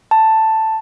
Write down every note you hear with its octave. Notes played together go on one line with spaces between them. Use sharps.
A5